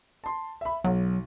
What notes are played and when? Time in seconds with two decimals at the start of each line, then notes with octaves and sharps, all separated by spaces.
0.24 A5 C6
0.61 E5 B5
0.84 B1 F#3